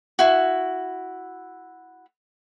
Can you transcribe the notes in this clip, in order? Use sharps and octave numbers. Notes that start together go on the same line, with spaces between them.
E4 F#4